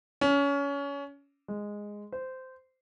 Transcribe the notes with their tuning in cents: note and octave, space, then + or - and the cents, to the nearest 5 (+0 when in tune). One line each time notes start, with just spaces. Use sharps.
C#4 +25
G#3 -5
C5 -15